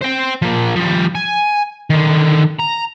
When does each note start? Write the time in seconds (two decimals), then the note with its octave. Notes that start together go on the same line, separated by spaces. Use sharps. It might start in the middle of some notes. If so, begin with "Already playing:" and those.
0.03 C5 G5
0.42 F3 A#3
0.76 F3 G3
1.15 G#5
1.90 D3 D#3
2.60 A#5